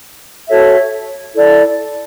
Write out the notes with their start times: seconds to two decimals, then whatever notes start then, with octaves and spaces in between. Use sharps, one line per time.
0.48 F#4 A4 C#5 E5
1.33 E4 A4 D5